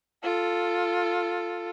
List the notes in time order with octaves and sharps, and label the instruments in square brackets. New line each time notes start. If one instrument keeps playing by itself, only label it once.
[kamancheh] F4 A4